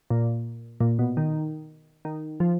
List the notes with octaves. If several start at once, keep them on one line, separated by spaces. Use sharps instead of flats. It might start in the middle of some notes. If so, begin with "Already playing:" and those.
A#2
A#2
B2
D#3
D#3
F3